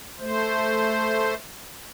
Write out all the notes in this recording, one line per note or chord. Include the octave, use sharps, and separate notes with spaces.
A3 C5